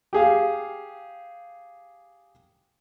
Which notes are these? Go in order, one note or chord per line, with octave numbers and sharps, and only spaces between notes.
G4 G#4 F5